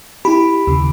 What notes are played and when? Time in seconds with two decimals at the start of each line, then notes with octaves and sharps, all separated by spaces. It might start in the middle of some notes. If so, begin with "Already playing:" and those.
0.25 E4 G4 B5
0.67 D#2 C#3